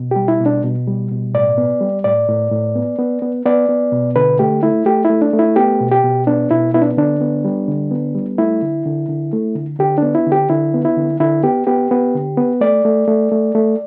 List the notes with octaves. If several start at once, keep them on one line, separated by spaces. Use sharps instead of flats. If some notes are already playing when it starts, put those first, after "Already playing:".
Already playing: B2
G3 G4
E4
B2
D4
B2
G3
B2
A2 D5
B3
G3
A2 D5
A2
A2
B3
B3
B3
B3 D5
B3
B2
D3 B4
A3 G4
A3 E4
A3 G4
E4
A3
D4
A3
E4
B3 G4
B2
G4
B2
B3 D4
B2 E4
B3 E4
D4
D3 D4
B3
G3
D3
B3
G3
A3 E4
D3
D3
D3
A3
D3
D3 G4
B3 D4
E4
D3 G4
D3 E4
B3
E4
D3
D3 E4
B3 G4
B3 G4
B3
D3
B3
A3 D5
A3
A3
A3
A3